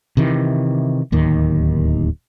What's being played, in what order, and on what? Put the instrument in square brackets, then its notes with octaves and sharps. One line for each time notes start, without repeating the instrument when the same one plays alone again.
[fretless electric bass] C3 D#3 E3
D1 D#2 D#3